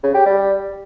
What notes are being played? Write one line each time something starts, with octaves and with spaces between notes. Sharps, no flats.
C#3
G4
G3